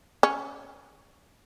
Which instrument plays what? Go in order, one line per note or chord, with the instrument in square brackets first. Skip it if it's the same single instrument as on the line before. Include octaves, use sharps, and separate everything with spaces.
[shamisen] C#4